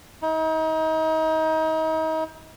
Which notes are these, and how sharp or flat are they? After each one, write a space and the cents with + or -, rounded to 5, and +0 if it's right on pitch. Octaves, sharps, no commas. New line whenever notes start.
D#4 +35